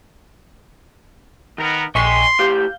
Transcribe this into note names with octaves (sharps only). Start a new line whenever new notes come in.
D#3 B3 A#4
A#1 D#5 G5 G#5 C6 C#6 B6
A2 G4 F5 G6